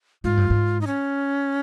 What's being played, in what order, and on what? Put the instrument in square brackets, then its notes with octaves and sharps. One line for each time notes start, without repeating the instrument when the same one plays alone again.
[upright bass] G#2 [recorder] F4
[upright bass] G2
G#2
[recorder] D#4
C#4